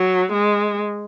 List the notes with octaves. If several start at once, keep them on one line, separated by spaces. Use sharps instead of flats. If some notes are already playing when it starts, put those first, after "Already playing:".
Already playing: F#3
G#3